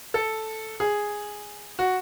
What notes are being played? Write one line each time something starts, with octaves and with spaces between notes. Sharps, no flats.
A4
G#4
F#4